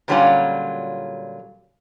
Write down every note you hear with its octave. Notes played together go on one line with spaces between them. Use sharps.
A#2 D3 F#3 G3 C#4 F4